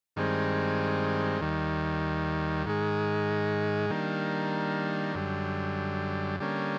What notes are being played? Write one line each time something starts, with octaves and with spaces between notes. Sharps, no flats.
G2 D#3 G#3 C4
D#2 D#3 G3
G#2 D#3 G#3
D#3 G3 A#3 D4
F#2 D3 G3
D3 G3 A#3 C#4